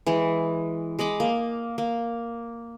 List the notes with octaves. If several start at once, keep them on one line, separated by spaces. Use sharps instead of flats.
E3 G#3
G#3 D#5 B5 D6
A#3
A#3